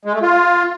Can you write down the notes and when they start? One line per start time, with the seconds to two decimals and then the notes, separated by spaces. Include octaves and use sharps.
0.05 G#3
0.13 A3
0.22 F4